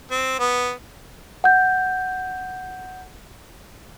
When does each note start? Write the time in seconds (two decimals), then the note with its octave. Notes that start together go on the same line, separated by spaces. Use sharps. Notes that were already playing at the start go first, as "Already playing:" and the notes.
0.11 C4
0.39 B3
1.44 F#5 G6